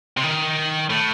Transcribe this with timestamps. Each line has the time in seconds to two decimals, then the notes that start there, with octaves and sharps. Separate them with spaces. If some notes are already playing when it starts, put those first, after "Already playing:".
0.17 C3
0.23 D#3
0.90 A2